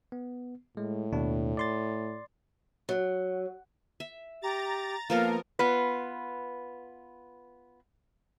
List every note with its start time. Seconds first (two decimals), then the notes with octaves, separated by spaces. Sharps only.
0.12 B3
0.77 A2 G#3
1.12 D#2 B2 D4
1.57 D5 C6 A6
2.89 F#3
4.00 E5
4.42 G4 A#5 A6
5.10 F3 A#3 B3 A4 A#4 F5
5.59 B3 F4 B4